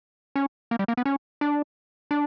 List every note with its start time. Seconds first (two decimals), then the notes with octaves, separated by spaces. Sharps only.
0.36 C#4
0.71 A#3
0.79 G3
0.88 A#3
0.97 B3
1.05 C#4
1.41 D4
2.11 D4